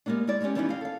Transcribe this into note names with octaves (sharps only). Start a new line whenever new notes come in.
G3 G#3 A#3 B3 D4
G#3 E4 D5
G3 G#3 B3 C#4 G4
E3 G3 B3 C#4 D#4 E4
C4 F5
A4 F5